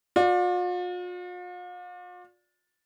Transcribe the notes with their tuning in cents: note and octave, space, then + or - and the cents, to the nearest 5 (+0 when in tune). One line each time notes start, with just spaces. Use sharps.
F4 +45 D5 +0